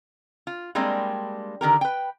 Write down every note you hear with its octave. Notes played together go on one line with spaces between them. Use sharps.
F4
G3 G#3 A#3 C4 D4
D3 D#3 G4 A#4
B4 G5